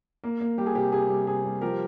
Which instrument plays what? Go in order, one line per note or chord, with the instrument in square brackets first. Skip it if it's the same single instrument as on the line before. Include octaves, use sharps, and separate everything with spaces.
[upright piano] A#3
A#3
G3 G4
G#4
C3 G4
C3 G#4
G3
C3 G#4
G3
F3 G4 A#4